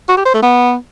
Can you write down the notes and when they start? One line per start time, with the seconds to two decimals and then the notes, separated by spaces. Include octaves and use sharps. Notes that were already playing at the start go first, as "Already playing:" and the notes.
0.09 F#4
0.17 G4
0.26 C5
0.34 A3
0.43 B3